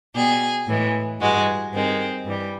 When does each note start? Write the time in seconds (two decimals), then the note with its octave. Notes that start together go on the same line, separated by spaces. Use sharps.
0.14 B2 G3 G#4
0.67 A2 E3 G#3
1.19 G2 E3 G#3 F#4
1.72 G2 D#3 G#3 C4
2.25 G2 E3 G3